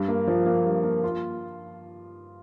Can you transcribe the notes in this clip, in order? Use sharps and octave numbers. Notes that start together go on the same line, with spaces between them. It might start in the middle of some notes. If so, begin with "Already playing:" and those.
Already playing: G2
A#3
F3
A#3
G2
A#3
F4